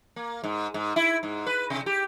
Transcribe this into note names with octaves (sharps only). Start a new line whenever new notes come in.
A#3
G#2
G#2
E4
G#2
B4
C3
G4